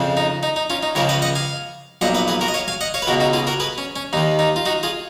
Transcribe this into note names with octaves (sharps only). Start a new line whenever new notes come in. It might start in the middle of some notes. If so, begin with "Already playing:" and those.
Already playing: F2 C#3 F3
D#4
D#4
D#4
C#4 F4
D#4
C#2 C#3 F3 A#4 C#5
B4 D#5
D#5 F#5
F5 G#5
B1 A#2 F3 D#5 F#5
B4 D#5
G#4 B4
F#4 A#4
D#5
C#5 F5
F5 G#5
D#5 F#5
C#5 F5
B4
C#2 B2 F#4 A#4
D#4 F#4
F4 G#4
F#4 A#4
G#4 B4
C#4
C#4
D#2 D#3 D#4
D#4
F4
D#4 F#4
F4 G#4